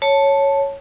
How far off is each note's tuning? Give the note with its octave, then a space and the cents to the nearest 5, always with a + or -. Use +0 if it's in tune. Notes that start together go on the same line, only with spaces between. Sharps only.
C#5 +0 A5 +0